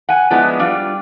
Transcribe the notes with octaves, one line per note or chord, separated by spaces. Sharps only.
F#5 G#5
F3 G#3 B3 D4 E4
G3 D4 F4